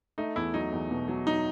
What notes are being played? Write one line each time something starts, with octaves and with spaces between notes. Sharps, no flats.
A3 D#4
E2 E4
F#3 D#4
E2
B2
F#3
F#3 D#4